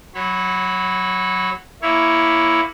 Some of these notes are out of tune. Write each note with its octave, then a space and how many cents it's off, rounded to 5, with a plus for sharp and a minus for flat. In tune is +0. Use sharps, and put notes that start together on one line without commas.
F#3 +0 C#5 -25 B5 +0
A#3 +0 E4 +0 C#5 +0